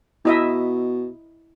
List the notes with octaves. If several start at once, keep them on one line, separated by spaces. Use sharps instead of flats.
B2 E4 D#5 E5